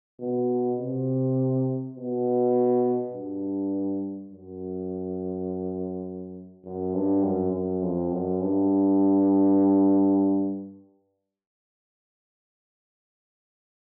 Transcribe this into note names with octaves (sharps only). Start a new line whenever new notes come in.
B2
C3
B2
G2
F#2
F#2
G2
F#2
F#2
F2
F#2
G2